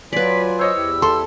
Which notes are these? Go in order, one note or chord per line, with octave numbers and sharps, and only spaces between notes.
F#3 F4 B4 D5 G#5 B6
C5 C#5 D#5 E6
E2 E4 G4
A4 C6